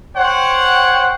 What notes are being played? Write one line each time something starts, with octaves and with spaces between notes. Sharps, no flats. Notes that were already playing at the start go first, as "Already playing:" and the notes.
C5 C#5 F#5 G5